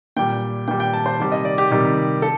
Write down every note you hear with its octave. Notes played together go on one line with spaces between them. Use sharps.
A#2 G3 G5
A#2 G3 G5
G5
A5
C5
C3 D#3 G3
D#5
D5
G4
C3 D#3 G3
A4